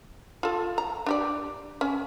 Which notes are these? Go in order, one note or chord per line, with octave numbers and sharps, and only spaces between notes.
F4 A4
A#5
D4 G4 D5
C#4